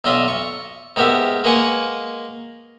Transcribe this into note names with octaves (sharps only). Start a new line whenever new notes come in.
B1 D4 F4 D#5 E5
C#6
G#2 B3 G4 A#4 E5
G#3 A#3 B4 F#5 G#5 C#6